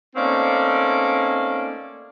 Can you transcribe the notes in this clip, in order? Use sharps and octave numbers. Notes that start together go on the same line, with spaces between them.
A3 A#3 C4 C#4 D#4 D5